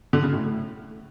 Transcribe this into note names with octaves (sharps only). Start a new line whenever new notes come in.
D3
C#3
A2